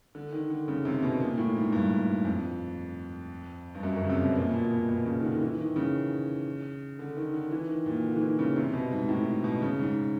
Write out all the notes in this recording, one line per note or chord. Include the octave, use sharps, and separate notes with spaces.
D3
D#3
D3
C#3
C3
B2
A#2
A2
G#2
G2
F2
G2
F#2
F#2
C#3
C3
B2
A#2
B2
A#2
B2
B2
C#3
D#3
D3
E3
D#3
C#3
D3
D#3
D3
E3
D#3
A#2
D3
E3
D#3
C#3
C3
B2
G#2
A2
B2
C#3
G#2